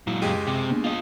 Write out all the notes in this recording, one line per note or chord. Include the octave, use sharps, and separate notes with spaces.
A#2 F#3 G#3 E4
C#2 F#2 G#3 G4 D#7
C3
A#3 B3 D4
F4 D#5